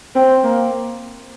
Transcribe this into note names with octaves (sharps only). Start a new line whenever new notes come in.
C4
A#3